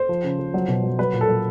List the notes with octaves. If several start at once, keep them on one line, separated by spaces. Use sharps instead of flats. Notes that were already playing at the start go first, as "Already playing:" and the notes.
Already playing: C5
F3
C#3
F3
F#3
B2
F#3
F#3 B4
A#2
A4
F#3